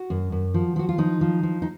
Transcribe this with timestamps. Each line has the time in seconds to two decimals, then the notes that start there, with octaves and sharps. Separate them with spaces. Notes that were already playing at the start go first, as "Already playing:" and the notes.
Already playing: F#4
0.10 F#2
0.32 F#2
0.54 F3
0.76 F3 F#4
0.89 F4
0.98 F3 D#4
1.21 F3
1.43 F3
1.62 D#4